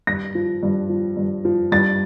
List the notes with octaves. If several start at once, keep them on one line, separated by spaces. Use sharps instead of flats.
G2 A#6
F3
G2
F3
G2
F3
G2 A6